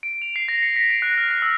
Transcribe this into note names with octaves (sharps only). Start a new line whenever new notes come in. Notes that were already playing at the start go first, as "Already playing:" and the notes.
D7
F7
C7
A#6
C#7
B6
D7
F#6
F6
A#6
E6